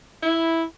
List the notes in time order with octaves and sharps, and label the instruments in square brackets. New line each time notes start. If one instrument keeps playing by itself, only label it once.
[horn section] E4